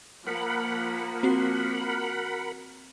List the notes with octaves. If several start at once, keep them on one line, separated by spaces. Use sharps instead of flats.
F3 A#3 A#4 F#5 B5
C4 F#4 C7